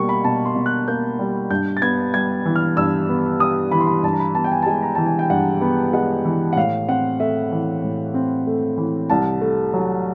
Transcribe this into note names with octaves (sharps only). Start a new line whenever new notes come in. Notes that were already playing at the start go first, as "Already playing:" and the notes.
Already playing: B2 G3 A#3 C#6
B5
B2 A5
C6
B2
F#6
A#3 G6
G3
G2 G6
A6
B3 G#6
G3 G#6
E3
F6
G2 E6
B3
G3 D#6
E3 B5
C6
B5
G2 A5
A#5
B5
B3 A5
G5
G#5
A5
G#3 G#5
A#5
E3 A5
G#5
G5
G2 F#5
B3
G#3 F#5
E3
F#5
A2 F5
C4 F#5
A3 E5
E3
A2
C4
A3
E3
C2 A5
A3
F#3